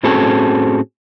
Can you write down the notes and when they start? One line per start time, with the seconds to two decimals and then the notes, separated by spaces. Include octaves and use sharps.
0.03 A2 C4 C#4 F#4 G#4 A4